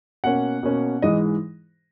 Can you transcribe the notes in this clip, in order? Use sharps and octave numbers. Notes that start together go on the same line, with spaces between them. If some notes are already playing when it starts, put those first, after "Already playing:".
B2 A#3 C#4 F#5
B2 A#3 C#4
G#2 E3 G#3 D#5